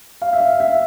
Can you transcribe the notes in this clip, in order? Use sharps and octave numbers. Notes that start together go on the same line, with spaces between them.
F5
E5
F5
E5